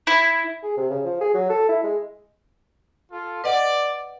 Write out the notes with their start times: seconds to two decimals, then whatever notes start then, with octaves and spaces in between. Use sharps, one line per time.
0.07 E4
0.63 G#4
0.77 C3
0.90 C#3
1.04 F3
1.21 G#4
1.34 F#3
1.49 A4
1.69 E4
1.84 G#3
3.11 F4 A4
3.44 B4 D5 D#5 F#5